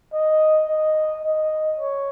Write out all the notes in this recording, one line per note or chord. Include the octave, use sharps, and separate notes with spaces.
D#5
D#5
D#5
C#5